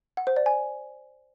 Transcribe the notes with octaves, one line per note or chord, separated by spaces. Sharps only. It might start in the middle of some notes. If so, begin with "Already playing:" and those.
F#5
C5
D5
G#5